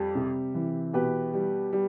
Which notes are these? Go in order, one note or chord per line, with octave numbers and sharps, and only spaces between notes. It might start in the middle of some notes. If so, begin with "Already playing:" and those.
Already playing: F2 G3 G4
C3
E3
B2 G4 B4
G3
G3